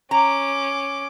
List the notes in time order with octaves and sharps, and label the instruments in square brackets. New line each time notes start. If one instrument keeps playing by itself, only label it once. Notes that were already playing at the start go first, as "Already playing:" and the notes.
[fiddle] C#4 D6 [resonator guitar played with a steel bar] A#5